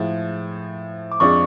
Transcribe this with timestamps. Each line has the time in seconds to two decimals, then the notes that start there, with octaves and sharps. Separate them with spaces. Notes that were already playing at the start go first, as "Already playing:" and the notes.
Already playing: A2 F3 G#3
1.12 D6
1.20 F2 F3 G#3 D4 C#6